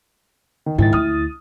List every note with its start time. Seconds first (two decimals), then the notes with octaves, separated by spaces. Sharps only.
0.66 D#3
0.78 A#1 G#2 D#3 E4 A6
0.93 D2 D#6 F6